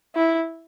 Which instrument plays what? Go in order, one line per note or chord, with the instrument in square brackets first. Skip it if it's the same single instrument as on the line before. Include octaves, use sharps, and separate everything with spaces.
[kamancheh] E4